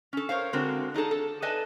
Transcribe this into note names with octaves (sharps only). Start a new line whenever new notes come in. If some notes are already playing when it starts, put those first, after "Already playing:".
C#4 A4
A#4 C5 C#5 F5
D3 G#3 C4 F#4 A#4
D4 D#4 G#4 A4
A4
A4 B4 D5 D#5 G#5 A5